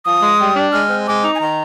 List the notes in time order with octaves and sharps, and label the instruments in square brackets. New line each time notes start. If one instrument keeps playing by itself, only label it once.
[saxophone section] F3 [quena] D#6
[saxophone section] G#3
G3
D4
[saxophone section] G#3 [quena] F6
[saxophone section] C4
[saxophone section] G#3 [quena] D6
[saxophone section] D#4
[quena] G#5
[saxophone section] D#3 [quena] A#5